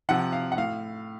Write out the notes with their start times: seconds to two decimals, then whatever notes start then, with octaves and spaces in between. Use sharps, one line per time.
0.09 C3 F3 F#5
0.32 F5
0.52 F#5
0.57 A2 F5